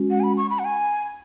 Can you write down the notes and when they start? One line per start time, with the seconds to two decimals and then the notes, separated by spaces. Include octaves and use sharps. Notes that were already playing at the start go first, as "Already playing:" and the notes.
Already playing: G#3 C#4 F#4
0.11 F#5
0.20 G#5
0.23 B5
0.37 C#6
0.50 B5
0.59 F#5
0.65 G#5